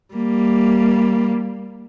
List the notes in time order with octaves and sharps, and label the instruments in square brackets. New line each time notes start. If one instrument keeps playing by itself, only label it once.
[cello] G3 A#3